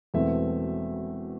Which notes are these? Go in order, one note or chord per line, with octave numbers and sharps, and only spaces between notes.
E1 E2 B2 A3 C4 E5